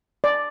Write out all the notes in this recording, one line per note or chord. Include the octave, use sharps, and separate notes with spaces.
D5